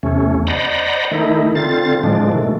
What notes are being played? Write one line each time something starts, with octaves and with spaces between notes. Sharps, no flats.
E2 C3 A3 C#4
C5 D5 D#5 F#5 A#5 B5
D#3 A3 D#4 E4
D3 C4 F4 A6
A2 F3 G#3 D4
B2 D#3 A3